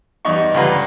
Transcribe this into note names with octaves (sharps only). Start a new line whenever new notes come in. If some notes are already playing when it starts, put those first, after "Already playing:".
E2 G2 D#4 C#6
C#2 G2 D3 F4 B4 A#5